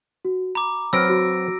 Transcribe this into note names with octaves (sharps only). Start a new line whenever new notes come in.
F#4
A#5 B5 D6
F#3 C4 B4 B5 E6 F6 A#6 D7
F#4